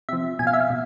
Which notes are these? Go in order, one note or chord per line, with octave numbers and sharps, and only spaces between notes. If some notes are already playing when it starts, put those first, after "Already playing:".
C3 F3 E5
B2 G#5
F5
E5
F5
B2